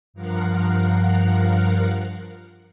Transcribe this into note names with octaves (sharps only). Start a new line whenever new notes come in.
G2 F3 A#4 F5 F#5